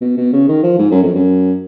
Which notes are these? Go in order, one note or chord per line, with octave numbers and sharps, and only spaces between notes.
B2
B2
C#3
D#3
F3
G#2
F#2
F2
F#2